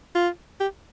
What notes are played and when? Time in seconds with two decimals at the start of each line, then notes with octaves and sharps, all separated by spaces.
0.15 F4
0.60 G4